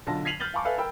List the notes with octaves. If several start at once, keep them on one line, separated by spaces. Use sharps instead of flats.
B1 D3 F4 A5 A#6
G#6 B6 C7 D#7 F7 F#7
F6 G6 A6 F#7 G7
F5 G#5 A5 B5 C#6 D6
A4 B4 E5 F5 G#5
A#4 G5 B5 E6